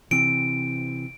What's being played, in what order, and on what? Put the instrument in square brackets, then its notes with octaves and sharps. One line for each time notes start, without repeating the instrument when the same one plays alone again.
[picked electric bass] C3 E3 C4 [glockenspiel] D7